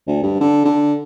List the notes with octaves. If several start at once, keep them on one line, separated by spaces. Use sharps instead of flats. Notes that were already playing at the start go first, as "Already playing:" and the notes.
D2
G2
D3
D3